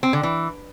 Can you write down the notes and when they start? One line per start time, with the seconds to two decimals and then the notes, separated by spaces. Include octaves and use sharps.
0.03 C4
0.13 D3
0.23 E3